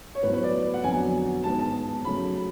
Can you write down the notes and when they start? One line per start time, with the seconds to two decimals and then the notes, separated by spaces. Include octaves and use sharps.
0.15 C#5
0.23 A2 F#3 B3 B4
0.33 B4
0.43 D5
0.74 F#5
0.84 F2 D3 F#3 B3 G#5
1.44 G#2 G#3 B3 A5
1.59 A5
2.04 C#3 F#3 A3 B5